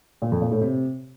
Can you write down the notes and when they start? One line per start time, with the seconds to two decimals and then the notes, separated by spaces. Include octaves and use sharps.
0.22 A#2
0.32 F2
0.42 A#2
0.51 A2
0.61 C3